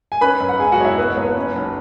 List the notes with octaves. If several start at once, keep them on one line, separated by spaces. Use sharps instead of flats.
G#5
C#4 B4 B5
F#2
F#5
E1 G#4 G#5
F#4 F#5
E1 C#5
E4 E5
B3 B4
C#5
F#1
B4
C#4
B1